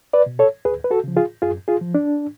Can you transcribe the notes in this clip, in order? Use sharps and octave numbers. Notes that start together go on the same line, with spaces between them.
B4 D5
B2
A4 C#5
D2 G#4 B4
B4
F#4 A4
C#3 F3
F4 G#4
F#2 F4 G#4
F4 G#4
F3
D4